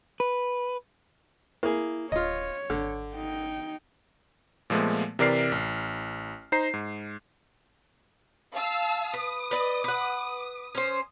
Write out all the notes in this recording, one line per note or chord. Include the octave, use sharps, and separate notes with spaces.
B4
A#3 E4 G#4
D1 F4 C#5 D#5
G#1 D3
D#4 G5
A#2 F3 G#3 A3 B3
C3 E3 A#4 D5 F6 C7
A1
D#4 C5 A#5 C7
G#2
F5 A5 E6
B4 D#6
B4 D5 D#5
B4 F#5
C#4 C5